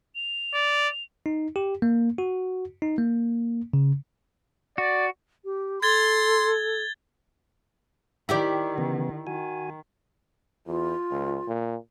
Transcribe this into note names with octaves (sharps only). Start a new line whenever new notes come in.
F7
D5
D#4
G4
A#3
F#4
D#4
A#3
C#3
F#4 D5
G4
A4 C6 G#6 A6 G7
D#3 E4 G4 D5
C#3 E3 B3
D#3 F#4 G#5
E2 F4
C#2
A#2